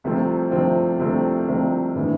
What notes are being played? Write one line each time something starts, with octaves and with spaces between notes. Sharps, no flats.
C2 C3 F3 A3 C4
C2 C3 F3 A3 C4
C2 C3 F3 A3 C4
C2 C3 F3 A3 C4
A2 E3 B3 D4